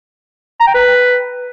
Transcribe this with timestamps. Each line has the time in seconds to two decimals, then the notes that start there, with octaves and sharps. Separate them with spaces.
0.60 A#5
0.67 G5
0.74 B4